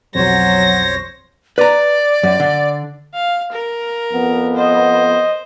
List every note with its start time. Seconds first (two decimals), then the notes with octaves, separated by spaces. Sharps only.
0.15 B1 F2 F#3 C5 C#5 A#6
1.58 B4 D5 A#5
2.23 F#2
2.40 D3
3.14 F5
3.52 A#4
4.13 F2 B3
4.56 C5 D#5